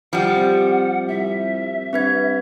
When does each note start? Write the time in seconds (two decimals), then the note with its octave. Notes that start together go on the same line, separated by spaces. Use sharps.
0.13 F3 G3 F#5
0.35 C3
1.08 C2 E5
1.93 G2 C4 B4 G#6